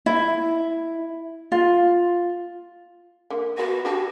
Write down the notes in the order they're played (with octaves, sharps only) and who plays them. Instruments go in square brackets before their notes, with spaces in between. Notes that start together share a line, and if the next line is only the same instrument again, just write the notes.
[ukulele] E4
F4
[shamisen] D3 A#3
[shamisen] B3 B4 [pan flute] F#4
[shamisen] D4 G4 A4 [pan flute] F#4